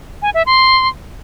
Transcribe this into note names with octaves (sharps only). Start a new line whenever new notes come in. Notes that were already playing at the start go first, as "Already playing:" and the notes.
G#5
E5
C6